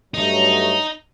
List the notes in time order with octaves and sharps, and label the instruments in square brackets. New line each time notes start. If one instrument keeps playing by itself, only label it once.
[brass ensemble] G2 F#3 A3 [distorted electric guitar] D#4